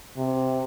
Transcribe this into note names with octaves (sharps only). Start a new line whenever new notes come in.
C3